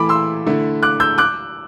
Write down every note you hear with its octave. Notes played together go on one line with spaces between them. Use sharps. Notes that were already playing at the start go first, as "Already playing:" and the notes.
Already playing: E3 A3 E4 B5 D6
C6 E6
D3 A3 E4
D6 F#6
E6 G6
D6 F#6